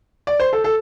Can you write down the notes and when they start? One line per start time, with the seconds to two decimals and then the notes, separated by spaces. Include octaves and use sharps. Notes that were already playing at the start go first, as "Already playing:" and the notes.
0.27 D5
0.40 C5
0.53 A4
0.64 A4